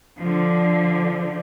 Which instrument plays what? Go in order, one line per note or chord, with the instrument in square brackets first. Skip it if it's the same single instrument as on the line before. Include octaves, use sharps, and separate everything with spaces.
[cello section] D3 F3